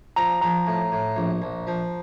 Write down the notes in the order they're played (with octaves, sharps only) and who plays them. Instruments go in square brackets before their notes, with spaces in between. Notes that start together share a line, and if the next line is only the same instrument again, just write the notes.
[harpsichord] F3 [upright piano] A#5
[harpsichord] F3 [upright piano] A#5
[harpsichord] A2
A2
A#1
A#1
F3